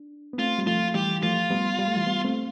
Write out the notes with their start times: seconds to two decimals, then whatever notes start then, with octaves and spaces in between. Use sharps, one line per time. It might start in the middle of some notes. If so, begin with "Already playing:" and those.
Already playing: D4
0.33 B3
0.39 A3 C4 F4
0.58 G3
0.67 F3 A3 F4
0.95 E3 G3 G4
1.23 F3 A3 F4
1.51 G3 B3
1.79 G3
1.88 A3
1.96 E3 G3
2.06 G3 B3
2.25 A3 C4